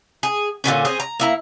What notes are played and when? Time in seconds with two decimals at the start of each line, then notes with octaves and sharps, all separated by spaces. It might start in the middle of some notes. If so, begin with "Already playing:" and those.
0.23 G#4
0.64 A#2 D3 D#3 C#4
0.85 C4 C#4 G#4
1.00 A#5
1.20 A#3 E4 A#5